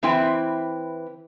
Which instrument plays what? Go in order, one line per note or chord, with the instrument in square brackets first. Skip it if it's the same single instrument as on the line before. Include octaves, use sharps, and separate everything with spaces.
[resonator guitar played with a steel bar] E3 C4 E4 B4 G5